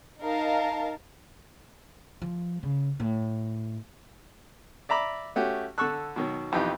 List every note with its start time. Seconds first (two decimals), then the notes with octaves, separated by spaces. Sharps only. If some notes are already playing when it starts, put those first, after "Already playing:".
0.21 D#4 A#4 F5 A5
2.22 F3
2.63 C#3
3.00 A2
4.89 D5 E5 A#5 B5 D6
5.36 A3 C#4 F#4 G4
5.78 D3 A4 A5 C#6 E6 F#6
6.16 B2 D#3 F#3
6.52 B1 F2 E3 D#4 G4